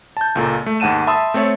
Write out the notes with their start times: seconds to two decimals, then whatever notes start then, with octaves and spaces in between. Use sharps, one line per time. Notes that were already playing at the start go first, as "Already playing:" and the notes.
0.17 A5 G6
0.35 C#2 A#2 A4 A#5
0.66 A3
0.80 D#2 G#2 F#5 A5 D#7 E7
1.07 E5 A5 B5 C6 D#6 E6
1.34 A3 C4 A4 C#5 E5